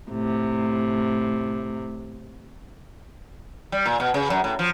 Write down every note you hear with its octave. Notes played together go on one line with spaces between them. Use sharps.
A2 C3
G3
A#2
B2
C#3
F#2
A2
F3